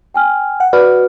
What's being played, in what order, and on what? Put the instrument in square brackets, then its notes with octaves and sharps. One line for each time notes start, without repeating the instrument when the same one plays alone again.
[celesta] G5 G#5 F6
[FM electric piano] F#5
[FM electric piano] F#4 B4 D5 [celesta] F6